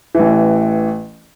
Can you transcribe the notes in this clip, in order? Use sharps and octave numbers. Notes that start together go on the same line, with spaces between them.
A1 E3